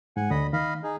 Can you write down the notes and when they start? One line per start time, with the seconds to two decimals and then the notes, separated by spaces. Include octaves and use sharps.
0.17 G#2 F#5 G#5
0.31 D2 D3 D#5 B5 D#6
0.53 D#3 D#5 F5 B5
0.83 D#4 G#4